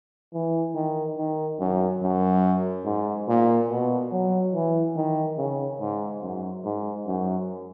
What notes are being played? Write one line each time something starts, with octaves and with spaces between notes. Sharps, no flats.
E3
D#3
D#3
F#2
F#2
G#2
A#2
B2
F#3
E3
D#3
C#3
G#2
F#2
G#2
F#2